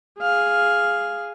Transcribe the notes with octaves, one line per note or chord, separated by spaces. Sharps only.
G#4 F5